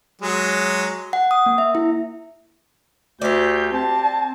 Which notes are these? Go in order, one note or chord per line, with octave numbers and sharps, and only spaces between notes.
F#3 G#3
F#5
D#6
A#3
E5
E4
D2 G4 D5 G6
C4 A5